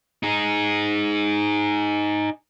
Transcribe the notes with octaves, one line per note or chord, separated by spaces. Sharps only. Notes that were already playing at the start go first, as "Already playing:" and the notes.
D#4 G#4